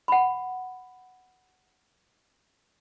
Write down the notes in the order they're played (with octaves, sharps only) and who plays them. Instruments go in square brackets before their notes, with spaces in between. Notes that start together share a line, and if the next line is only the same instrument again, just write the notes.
[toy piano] F#5 B5